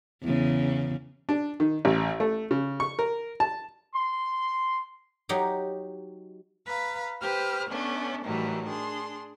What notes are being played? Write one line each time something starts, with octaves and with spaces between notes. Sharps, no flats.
E2 C#3
D4
D#3
A1
A3
C#3
C#6
A#4
A5
C6
F#3 D#4 G4
B4 F5 A#5 B5
G4 B4 C5 F6
A3 B3 C#4 D4
A2 D#3 E3 F#3 G3
D4 G#4 C6